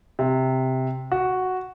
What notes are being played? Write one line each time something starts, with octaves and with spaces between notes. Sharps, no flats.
C3
F#4